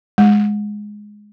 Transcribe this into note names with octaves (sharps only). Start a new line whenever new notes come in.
G#3